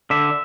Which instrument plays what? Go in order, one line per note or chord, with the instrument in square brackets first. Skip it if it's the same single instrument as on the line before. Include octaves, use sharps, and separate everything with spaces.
[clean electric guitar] D3 E5